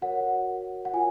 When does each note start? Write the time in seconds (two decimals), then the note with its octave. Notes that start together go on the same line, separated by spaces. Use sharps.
0.02 F#4 A#4 C#5 F#5
0.85 F#5
0.93 F4 A#4 C#5 G#5